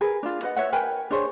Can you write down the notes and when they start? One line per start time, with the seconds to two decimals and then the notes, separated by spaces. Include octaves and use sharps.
0.01 G#4 A#4 B4
0.23 D4 F4
0.43 B4 D#5 F#5
0.56 B4 C#5 E5 F#5
0.72 A#4 B4 G5 G#5
1.11 D4 G#4 C5 C#5